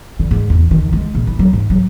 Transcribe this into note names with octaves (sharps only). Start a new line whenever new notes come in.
D3
G#2
E2
D#3
G#3
A#1
E4
F#3
G#2
F#3